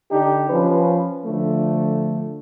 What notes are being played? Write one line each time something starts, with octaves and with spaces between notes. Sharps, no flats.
D3 D4 D#4 G4
F3 C#4 B4
D3 F3 A3